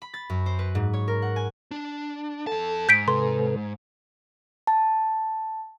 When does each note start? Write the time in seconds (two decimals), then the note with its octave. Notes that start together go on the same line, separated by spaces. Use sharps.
0.02 B5
0.14 A6
0.30 F#2
0.46 C5
0.59 B4
0.75 G#2
0.93 C#5
1.08 A#4
1.22 F#5
1.36 G#5
1.71 D4
2.47 F2 A4 A5
2.89 G#2 G6 B6 D7
3.08 C3 A4 B4 C6
4.67 A5